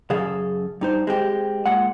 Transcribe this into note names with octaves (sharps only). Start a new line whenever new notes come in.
F#2 C#3 G#4 A4 F5
G2 D#4 C5
G#3 C4 G4
A#2 G#3 F#5